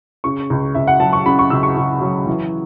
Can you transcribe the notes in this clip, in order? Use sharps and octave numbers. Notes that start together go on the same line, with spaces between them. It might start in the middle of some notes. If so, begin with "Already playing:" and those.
C#3 C#6
C#2
C#2 E5
F#5
F#3 A5
C#6
C#3 B5
C#6
C#2 E6
C#6
C#2
F#3
E3